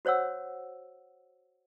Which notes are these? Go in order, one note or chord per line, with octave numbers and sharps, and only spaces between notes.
F#4 C5 C#5 F#5 E6